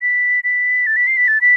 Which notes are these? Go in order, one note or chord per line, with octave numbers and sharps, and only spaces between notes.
B6
B6
A6
B6
C7
B6
A6
B6